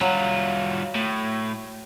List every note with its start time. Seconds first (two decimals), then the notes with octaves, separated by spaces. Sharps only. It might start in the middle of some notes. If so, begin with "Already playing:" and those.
0.01 F#3 G3 F4
0.95 A2